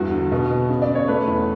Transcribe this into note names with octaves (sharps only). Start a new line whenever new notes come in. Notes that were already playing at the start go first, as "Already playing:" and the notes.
Already playing: E2 G2 F#4
D3
B2
B3
C#3
D5
C#3
C#5
A3 B4
E2